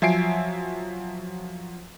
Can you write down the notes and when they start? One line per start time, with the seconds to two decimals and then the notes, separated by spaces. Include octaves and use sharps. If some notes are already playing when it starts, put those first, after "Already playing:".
0.02 F3 F#3 E5 G#5 C7 D7